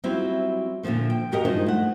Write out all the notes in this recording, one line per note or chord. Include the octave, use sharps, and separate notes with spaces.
F#3 G3 C4 E4 F4
A#2 D3 E3 F3 A3
G5
G#2 F#4 G4 A#4 D#5
G2 F3 G#3 D#4 C5
A3 F#5